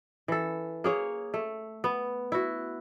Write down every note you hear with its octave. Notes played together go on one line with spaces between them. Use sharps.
E3 A4
A#3 G#4 C#5
A3
B3
E4 F#4